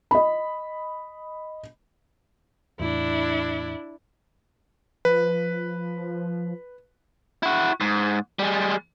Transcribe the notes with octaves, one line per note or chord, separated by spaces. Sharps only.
D#5 B5
E2 A2 D4 E4
F3 B4
E4 F#4
G#2
G3 G#3